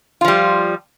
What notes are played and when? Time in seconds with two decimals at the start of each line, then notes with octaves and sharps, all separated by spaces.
0.21 F4
0.24 F3
0.28 G3